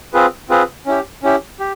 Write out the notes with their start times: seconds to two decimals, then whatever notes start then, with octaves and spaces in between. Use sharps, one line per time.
0.14 C4 F4 G#4 B4
0.49 C4 F4 G#4 B4
0.86 C#4 E4 G4
1.23 C#4 E4 G4
1.60 G4